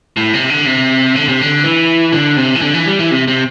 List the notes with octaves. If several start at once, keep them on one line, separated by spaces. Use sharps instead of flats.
A2
C3
D3
C3
D3
C3
D3
E3
D3
C3
E3
D3
E3
G3
E3
C3
C3